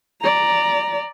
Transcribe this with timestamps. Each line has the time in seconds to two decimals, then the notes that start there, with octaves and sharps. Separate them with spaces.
0.21 D5 A#5